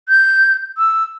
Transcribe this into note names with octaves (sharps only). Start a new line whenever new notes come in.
G6
E6